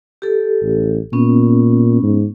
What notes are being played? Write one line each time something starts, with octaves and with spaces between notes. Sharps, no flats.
G4 A4
A1
A#2 B3 C#4
G#2